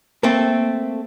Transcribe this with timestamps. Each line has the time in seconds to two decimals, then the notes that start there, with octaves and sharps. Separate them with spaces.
0.23 A3 A#3 C4 A4